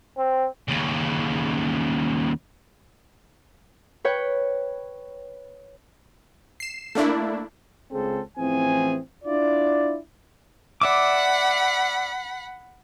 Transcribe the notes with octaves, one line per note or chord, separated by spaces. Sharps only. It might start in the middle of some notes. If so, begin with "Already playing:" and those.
C4
D#2 C#3
B4 C#5 G5
C7 E7
A3 A#3 D4 E4
C#2 C#3 C4 G#4 A4 C5
A1 E3 F3 C4 G#4 G#5
D4 E4 F4 D5
D5 E5 F#5 B5 D6